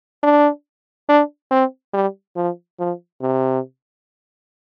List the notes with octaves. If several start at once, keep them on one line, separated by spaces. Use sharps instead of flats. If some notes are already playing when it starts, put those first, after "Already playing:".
D4
D4
C4
G3
F3
F3
C3